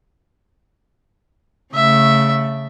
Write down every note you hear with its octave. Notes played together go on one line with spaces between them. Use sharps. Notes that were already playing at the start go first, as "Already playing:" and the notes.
C#3 A3 E5